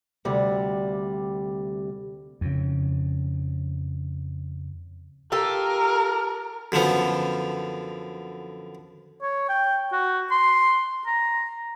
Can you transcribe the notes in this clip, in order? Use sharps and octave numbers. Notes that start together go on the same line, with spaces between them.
D2 C3 G3
F2 C#3
F4 G4 A4 A#4
F#2 D3 F3 B3
C#5
G5
F#4
C6
A#5